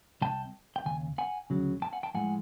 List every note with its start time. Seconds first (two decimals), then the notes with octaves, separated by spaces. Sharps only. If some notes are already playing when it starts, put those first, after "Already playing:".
0.21 C2 C3 G5 A5
0.76 G5
0.85 D#2 C#3 G#5
1.18 F#5 G#5
1.50 D2 C#3 F#3
1.82 G5 A5
1.93 F#5 G#5
2.03 G5 A5
2.14 A2 F3 G#3 F#5 G#5